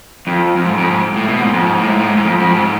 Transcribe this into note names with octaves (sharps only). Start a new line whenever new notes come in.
F2
F2
G#2
F2
G#2
A2
B2
G#2
F2
G#2
A2
G#2
A2
G#2
G#2
F2
F2
G#2